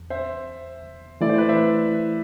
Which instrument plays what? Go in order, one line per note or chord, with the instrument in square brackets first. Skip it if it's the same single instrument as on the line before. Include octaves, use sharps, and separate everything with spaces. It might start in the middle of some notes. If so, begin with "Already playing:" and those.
Already playing: [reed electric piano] E2
[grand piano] C5 E5
[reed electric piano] E3 A3 E4 [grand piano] D5
[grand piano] C5
B4 D5
C5 E5